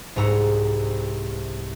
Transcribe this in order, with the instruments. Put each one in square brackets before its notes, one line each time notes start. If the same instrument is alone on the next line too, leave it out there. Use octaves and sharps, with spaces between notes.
[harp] C2 G#2 A#5 E6 C#7